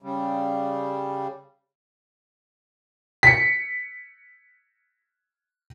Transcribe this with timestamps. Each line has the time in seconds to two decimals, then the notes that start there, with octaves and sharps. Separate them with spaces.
0.02 C#3 G3
3.23 B6 C#7